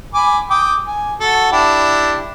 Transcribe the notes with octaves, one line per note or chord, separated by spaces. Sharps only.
G#5 B5 D6
G5 D6 D#6
G#5
F#4 A4
D4 E4 G4